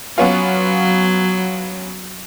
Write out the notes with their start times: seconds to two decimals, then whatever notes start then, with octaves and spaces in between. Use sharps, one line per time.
0.18 F#3 B3 C#4 F4